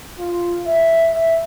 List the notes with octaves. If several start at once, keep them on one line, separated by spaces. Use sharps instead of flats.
F4
E5
E5